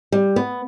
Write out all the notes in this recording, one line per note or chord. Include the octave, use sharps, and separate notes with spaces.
G3
B3